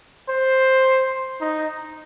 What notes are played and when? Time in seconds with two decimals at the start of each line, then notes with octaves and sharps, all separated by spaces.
0.29 C5
1.41 D#4